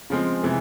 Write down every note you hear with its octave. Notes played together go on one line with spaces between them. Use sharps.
C#3 F3 G#3 C4
C3 E3 G#3